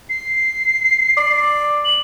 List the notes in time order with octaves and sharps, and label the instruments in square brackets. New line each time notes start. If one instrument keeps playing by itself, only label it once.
[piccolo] C7
[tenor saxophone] D5
[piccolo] F#7